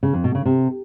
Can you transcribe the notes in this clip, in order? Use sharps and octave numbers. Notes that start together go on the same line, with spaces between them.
C#3
F2
B2
C#3
C3